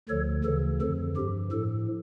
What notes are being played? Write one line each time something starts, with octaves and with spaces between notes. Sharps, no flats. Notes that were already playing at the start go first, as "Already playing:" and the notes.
D2 D3 F3 A4 C#5
D2 C#3 E3 A4
F2 D3 F3 A4
G2 F3 G4
A2 F3 A4